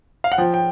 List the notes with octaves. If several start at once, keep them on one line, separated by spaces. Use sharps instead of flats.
F5
F#5
F3 G5
G5